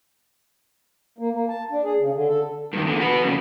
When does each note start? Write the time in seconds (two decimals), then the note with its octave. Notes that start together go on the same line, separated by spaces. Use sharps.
1.18 A#3
1.32 A#3
1.49 A5
1.71 D4
1.84 G#4
1.98 C#3
2.14 D3
2.29 A4
2.73 G2 D#3
2.85 E2 D3
3.00 F#4 B4
3.22 F2 C#3